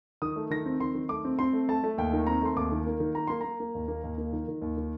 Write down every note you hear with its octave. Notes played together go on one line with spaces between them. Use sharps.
D#3 D#6
A3
D#3 A#6
C4
D#3 C6
D#3
A3 D6
C4
C4 C6
A3
A3 A5
A3
D#2 G5
D#3
C4 A#5
A3 C6
D#2 D6
D#3
A#3
D#3
A#3 A#5
A#3 C6
A#3 A#5
A#3
D#2
A#3
D#2
A#3
D#3
D#3
D#2
D#3